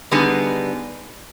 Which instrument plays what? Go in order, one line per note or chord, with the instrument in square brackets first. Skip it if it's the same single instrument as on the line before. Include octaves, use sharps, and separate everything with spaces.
[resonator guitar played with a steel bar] D3 G3 B3 D#4 G#4